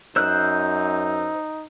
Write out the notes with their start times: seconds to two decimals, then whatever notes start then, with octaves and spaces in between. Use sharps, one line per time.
0.16 F#2 D#4 C5 E6 F#6